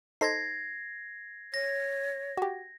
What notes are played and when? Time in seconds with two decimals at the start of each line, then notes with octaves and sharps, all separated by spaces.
0.21 D#4 A4 C5 G#6 A#6 C7
1.54 C#5 A#6
2.37 F#4 G4